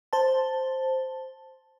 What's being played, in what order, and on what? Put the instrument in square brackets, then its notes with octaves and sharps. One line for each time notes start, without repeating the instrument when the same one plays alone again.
[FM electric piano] C5 A5